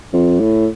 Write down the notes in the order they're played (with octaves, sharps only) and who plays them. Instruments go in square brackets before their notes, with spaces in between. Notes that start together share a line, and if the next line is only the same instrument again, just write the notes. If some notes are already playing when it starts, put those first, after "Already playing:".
[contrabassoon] F2
A2